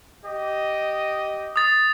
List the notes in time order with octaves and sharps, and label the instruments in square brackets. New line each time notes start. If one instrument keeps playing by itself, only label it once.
[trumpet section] G4 D#5
[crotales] D#6 A6